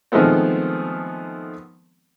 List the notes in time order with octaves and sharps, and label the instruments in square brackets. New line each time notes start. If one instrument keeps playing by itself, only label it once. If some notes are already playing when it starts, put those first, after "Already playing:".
[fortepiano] D#3 F3 G#3 A3 B3 C4